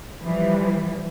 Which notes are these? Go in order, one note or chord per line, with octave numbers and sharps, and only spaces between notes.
E3 F3 G3